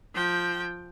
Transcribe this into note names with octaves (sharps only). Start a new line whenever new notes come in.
F3 G5